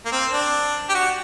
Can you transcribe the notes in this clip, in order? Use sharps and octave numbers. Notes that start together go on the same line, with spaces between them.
A#3
C4
D4
G4
F#4